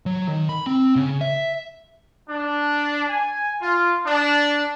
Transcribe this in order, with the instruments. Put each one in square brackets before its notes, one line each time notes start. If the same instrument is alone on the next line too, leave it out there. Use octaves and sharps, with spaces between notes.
[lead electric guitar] F#3
D#3
B5
C4
C#3
E5
[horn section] D4
G#5
F4
D4